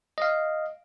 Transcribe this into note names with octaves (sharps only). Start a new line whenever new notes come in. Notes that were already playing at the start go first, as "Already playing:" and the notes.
D#5 F5